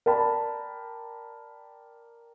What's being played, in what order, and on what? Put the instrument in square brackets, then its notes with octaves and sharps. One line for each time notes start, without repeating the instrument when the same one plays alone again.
[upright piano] A#4 D5 G5 A5 B5